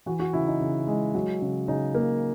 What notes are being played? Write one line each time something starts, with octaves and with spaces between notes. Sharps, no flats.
E3 F#4
F#4
C#3 E4
D#4
C#3
G#3
F#3
C#3
C#3 D#4
A#3